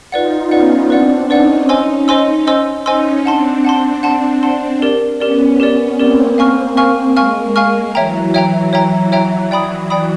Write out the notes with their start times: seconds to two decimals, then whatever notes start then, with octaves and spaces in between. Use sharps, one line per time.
0.12 D#4 F4 B4 D5 F#5
0.51 B3 C#4 B4 D5 F#5
0.90 C4 D4 B4 D5 F#5
1.29 C#4 D#4 B4 D5 F#5
1.69 C5 D#5 G#5 C6 E6
2.08 C5 D#5 G#5 C6 E6
2.47 C5 D#5 G#5 C6 E6
2.86 C#4 D#4 C5 D#5 G#5 C6 E6
3.25 C4 D4 F#5 A5 C6
3.64 C4 D4 F#5 A5 C6
4.03 F#5 A5 C6
4.43 F#5 A5 C6
4.82 G4 A#4 D5
5.20 B3 C#4 G4 A#4 D5
5.60 G4 A#4 D5
5.98 A#3 C4 G4 A#4 D5
6.38 F5 G#5 C#6 F6
6.77 A#3 C4 F5 G#5 C#6 F6
7.16 G#3 A#3 F5 G#5 C#6 F6
7.55 G#3 A#3 F5 G#5 C#6 F6
7.94 E3 F#3 C#5 E5 G5 A#5
8.34 C#5 E5 G5 A#5
8.72 E3 F#3 C#5 E5 G5 A#5
9.12 C#5 E5 G5 A#5
9.51 D5 G5 B5 D#6
9.90 D5 G5 B5 D#6